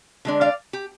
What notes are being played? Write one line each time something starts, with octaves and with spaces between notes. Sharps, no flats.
D3 G#3 D4
D5 F5
G4